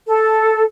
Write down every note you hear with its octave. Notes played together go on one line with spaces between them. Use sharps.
A4